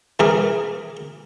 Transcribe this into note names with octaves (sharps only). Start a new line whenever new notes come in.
E3 G#4 A#4